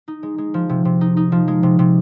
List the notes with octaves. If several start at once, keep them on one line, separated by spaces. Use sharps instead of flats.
D#4
G#3
G#3
F3
C3
C3
D#4
D#4
F3
G#3
C3
C3